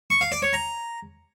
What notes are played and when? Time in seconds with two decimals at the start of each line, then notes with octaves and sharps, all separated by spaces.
0.10 C#6
0.21 F5
0.32 D5
0.42 C#5
0.53 A#5